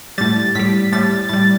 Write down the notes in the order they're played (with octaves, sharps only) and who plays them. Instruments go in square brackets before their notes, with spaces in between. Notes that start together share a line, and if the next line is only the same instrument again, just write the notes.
[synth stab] A2 G3 A6
A2 G3 B6
A2 G3 A6
A2 G3 A6